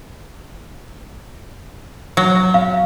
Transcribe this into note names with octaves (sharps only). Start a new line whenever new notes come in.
F#3
F5